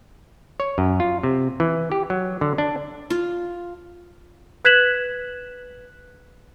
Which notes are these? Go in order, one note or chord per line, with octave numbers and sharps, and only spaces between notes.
C#5
F#2
F4
C3
E3
G4
F#3
D3
D4
F4
B4 F#6 G#6 B6 E7 F#7